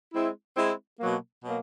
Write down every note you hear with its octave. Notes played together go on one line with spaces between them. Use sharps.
G#3 C4 E4
G#3 C4 E4
B2 F#3 A#3
B2 F#3 A#3